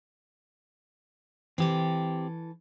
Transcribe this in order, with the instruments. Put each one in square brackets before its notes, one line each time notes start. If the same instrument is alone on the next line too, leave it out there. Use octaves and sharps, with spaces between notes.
[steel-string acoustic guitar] E3 A4 [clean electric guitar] C4 G4